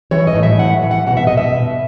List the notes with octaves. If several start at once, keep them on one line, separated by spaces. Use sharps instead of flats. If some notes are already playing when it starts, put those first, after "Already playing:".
E3 C#5
D#5
A2
E5
E3 F#5
E3
F#5
B2 F#5
E5
B2 D#5
E5
B2